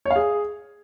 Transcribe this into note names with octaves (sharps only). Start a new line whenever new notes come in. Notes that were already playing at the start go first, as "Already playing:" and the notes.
C#5
F5
G#4